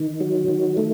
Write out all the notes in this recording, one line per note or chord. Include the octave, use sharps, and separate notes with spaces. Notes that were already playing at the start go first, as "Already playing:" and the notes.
Already playing: D#3
F#3
D#3
A3